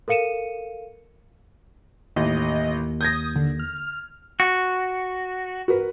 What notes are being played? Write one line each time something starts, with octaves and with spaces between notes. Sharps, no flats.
A4 A#4 F5 C#7 D#7 E7
A1 D#2 D#5
D#6 G6 G#6 A#6
D3
F6
F#4
F#4 A#4 B4